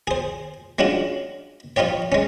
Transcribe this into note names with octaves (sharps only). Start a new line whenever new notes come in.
G#4 C5
G#3 C#4 D4 F4 F#4
F3 D#4 F4 G4 C#5
G#3 C#4